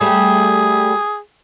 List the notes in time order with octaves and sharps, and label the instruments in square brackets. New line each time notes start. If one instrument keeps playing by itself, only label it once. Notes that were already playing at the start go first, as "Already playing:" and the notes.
[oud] G3 A3 [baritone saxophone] G#4